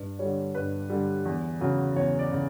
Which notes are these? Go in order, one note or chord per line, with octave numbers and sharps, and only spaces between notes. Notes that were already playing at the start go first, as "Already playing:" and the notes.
Already playing: G2 B4
D3 G3 C#5
G2 B4
D3 G3
E2
C#3 F#3
E2 C#5
D5
C#3